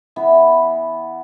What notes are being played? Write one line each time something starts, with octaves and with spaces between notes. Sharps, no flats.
E3 B3